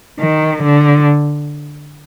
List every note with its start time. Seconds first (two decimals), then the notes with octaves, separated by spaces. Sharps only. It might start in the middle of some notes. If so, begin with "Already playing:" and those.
0.20 D#3
0.63 D3